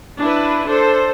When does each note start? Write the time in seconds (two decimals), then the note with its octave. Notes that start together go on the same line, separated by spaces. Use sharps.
0.19 D4 E4 B4
0.67 D4 A4 C5